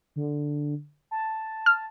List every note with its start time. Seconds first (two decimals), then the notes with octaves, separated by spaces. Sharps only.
0.16 D3
1.11 A5
1.66 F6